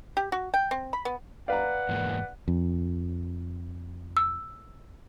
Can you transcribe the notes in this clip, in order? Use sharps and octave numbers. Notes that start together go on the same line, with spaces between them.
G4
F#4
G5
C4
B5
B3
B4 D5 F5 F#5 A#5
E2 G#2 A#3
F2
E6